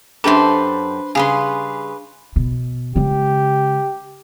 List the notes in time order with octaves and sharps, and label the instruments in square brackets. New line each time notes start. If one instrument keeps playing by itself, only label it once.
[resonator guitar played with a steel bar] F#2 G4 A4 [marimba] D4 [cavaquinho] B4 C5
[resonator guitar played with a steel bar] C#3 G3 [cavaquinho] G#4 B4 C6 [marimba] F5
[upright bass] B2
[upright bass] C#3 G#3 [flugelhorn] G4